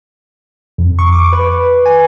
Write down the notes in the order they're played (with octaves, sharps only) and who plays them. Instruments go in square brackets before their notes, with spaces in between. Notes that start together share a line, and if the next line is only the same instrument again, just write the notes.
[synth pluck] F2
C#6
D6
B4
G#5